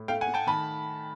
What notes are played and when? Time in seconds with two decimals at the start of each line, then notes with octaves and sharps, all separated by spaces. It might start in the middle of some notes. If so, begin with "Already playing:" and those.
Already playing: A2
0.08 A3 F5 G5
0.21 F#5 G#5
0.27 A3
0.34 G5 A5
0.47 D#3 A5 B5